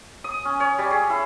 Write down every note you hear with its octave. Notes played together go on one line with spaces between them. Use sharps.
D#6
C#4
C#5
G3
G#4
E4